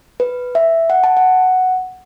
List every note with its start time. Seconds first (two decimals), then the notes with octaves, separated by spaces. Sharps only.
0.20 B4
0.55 E5
0.90 F#5
1.04 A5
1.17 F#5